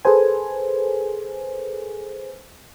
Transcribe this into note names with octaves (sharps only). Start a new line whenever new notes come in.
G#4 A4 B4 C5 G#5